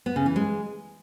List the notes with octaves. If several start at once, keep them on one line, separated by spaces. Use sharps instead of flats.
B3
C#3
E3
G#3